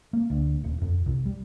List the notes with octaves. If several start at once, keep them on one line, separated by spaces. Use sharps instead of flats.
A#3
D2
D#1
F2
C2
G3